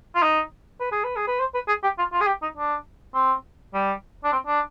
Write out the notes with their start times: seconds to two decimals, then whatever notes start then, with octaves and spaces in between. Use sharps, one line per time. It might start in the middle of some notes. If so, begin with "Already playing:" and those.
0.15 F4
0.22 D#4
0.80 B4
0.92 G#4
1.04 B4
1.16 G#4
1.27 B4
1.40 C5
1.54 B4
1.68 G#4
1.83 G4
1.98 F4
2.12 F4
2.21 G#4
2.27 G4
2.42 D#4
2.57 D4
3.14 C4
3.74 G3
4.24 D4
4.32 C4
4.47 D4